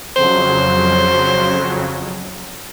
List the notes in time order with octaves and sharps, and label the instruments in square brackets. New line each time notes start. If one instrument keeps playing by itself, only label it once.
[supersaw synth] F2 C#3 F#3 [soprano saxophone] C5